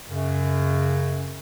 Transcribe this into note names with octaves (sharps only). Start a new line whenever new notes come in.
F#2 C#3